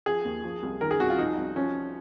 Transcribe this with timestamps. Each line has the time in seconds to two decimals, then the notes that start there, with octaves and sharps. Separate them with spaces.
0.06 F3 G#4
0.25 D#2
0.44 F3
0.63 C2
0.81 D#3 A#4
0.91 G#4
1.00 C2 F#4
1.10 F4
1.18 F3 D#4
1.38 C2
1.56 F3 C#4